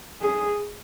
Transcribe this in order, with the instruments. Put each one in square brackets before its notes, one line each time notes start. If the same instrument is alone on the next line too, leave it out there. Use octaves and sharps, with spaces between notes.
[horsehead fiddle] G#4